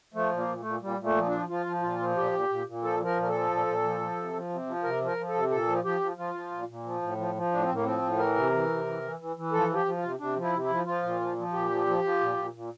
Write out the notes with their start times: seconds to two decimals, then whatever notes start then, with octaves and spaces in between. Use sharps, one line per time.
0.14 F3 A3
0.31 A#2
0.37 A#3
0.48 A#2
0.60 A3
0.65 A#2
0.82 A#2 G3
0.98 A#2
1.04 A3
1.16 F3
1.26 D4
1.31 F3
1.49 F3 F4
1.66 F3
1.82 A#2 F4
1.99 F3
2.16 A#2 G4
2.32 A#2
2.49 A#2
2.66 A#2
2.83 F3 A4
2.99 F3
3.05 A#4
3.16 A#2
3.22 A#4
3.28 A4
3.33 F3
3.50 A#2
3.66 A#2
3.83 F3
4.00 F3
4.16 C3
4.33 F3
4.49 C3
4.67 F3
4.83 C3 A#4
5.01 F3
5.06 A#4
5.17 F3
5.28 A4
5.34 C3
5.50 A#2 A4
5.67 F3
5.84 F3 G4
6.01 F3
6.17 F3 F4
6.34 F3
6.51 A#2
6.68 A#2
6.84 F3
7.02 A2
7.18 F3
7.35 F3
7.51 A2 D4
7.62 C4
7.68 A2
7.73 A#3
7.84 F3 C4
8.02 A2
8.18 E3 A#4
8.36 C3
8.52 E3
8.69 C3
8.85 E3
9.02 E3
9.19 E3
9.36 E3
9.52 F3 A4
9.69 F3
9.75 G4
9.86 F3
9.96 F4
10.03 C3
10.19 C3 D4
10.36 F3
10.42 E4
10.53 C3
10.64 E4
10.70 F3
10.86 F3 F4
11.03 A#2
11.20 F3
11.36 F3
11.53 A#2 G4
11.70 F3
11.86 F3
12.04 F3
12.20 A#2
12.37 A#2
12.53 A#2